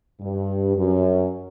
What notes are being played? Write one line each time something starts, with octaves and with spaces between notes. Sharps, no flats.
G2
F#2